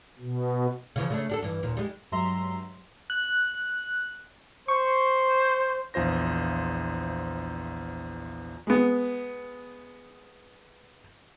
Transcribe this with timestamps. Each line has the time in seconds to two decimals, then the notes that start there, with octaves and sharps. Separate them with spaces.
0.19 B2
0.96 C#3 E3 F3
1.10 C#3 A3 D4
1.29 D4 G4 A4
1.42 G2 E3
1.63 D#2 A#2
1.77 G3 G#3
2.12 G2 F#3 G#3 E5 A#5 C6
3.10 F#6
4.68 C5 C#6
5.94 A#1 E2 F4 C5 A#6
8.67 G#3 B3